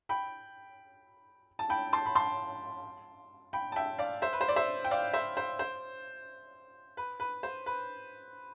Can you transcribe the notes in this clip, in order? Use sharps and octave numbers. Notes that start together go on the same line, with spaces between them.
G5 B5
A5
G5 B5
A5 C6
B5
A5 C6
G5 B5
A5
E5 G5
D5 F5
C5 E5
B4
C5
D5
C5 E5
G5
D5 F5
C5 E5
C5
C5
B4
B4
C5
B4